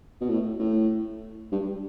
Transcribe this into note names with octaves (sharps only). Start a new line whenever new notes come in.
B2
A2
A2
G2